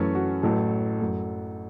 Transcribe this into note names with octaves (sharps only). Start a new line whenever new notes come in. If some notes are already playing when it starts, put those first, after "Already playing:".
Already playing: F#2 E3 A3 C#4
F#4
A1 A2 F#3 A3 A4
F#2 F#3 A3